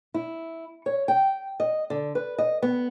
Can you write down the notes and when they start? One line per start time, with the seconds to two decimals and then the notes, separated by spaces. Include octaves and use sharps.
0.14 E4
0.86 C#5
1.08 G5
1.60 D#5
1.90 D3
2.15 B4
2.38 D#5
2.62 B3